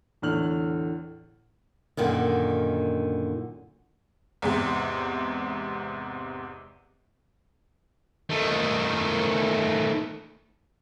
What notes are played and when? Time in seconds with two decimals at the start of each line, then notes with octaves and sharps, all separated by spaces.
0.22 E2 A2 D3 F6 F#7
1.97 F#2 A#2 D3 D#3
4.42 E2 G#2 C3
8.30 D#3 A3